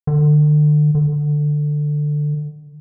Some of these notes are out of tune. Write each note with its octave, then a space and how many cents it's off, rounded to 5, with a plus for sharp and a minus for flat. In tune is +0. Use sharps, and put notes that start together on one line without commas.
D3 +35
D3 +15